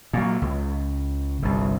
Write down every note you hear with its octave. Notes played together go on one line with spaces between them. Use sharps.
A#2 F#3
C#2
G1 C2